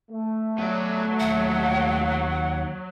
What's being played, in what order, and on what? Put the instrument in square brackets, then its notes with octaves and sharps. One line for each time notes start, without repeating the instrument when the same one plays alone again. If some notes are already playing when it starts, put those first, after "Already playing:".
[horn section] A3
[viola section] F#3 [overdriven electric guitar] B3 D5
[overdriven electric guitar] D#2 E5 [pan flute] F#5